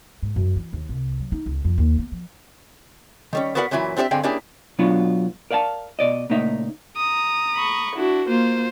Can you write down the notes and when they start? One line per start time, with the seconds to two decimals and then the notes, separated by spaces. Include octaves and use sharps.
0.23 G#2
0.36 F#2
0.56 E3
0.73 D#2
0.89 C2
1.20 F#3
1.32 D#4
1.46 C#2
1.65 F2
1.78 D#2
1.98 B3
2.12 F3
3.33 D#3 G3 C#4
3.55 B3 F#4 A#4 B4 D5 F#5
3.71 F#2 A#2 E3 F#3 E4
3.97 C4 D4 G4 D5 E5
4.11 G2 D3 C4 G#4 D#5 G5
4.23 A#3 C#4 D4 E4 G4 G#4
4.79 B2 F#3 B3 D4 F4
5.51 A#4 D5 F5 G5 A5
5.99 B2 D5 D#5
6.30 A#2 C#3 A3 A#3 D#4 E5
6.96 A#5 D#6
7.55 B5 C#6
7.95 D4 E4 F#4
8.28 A#3 F4 C5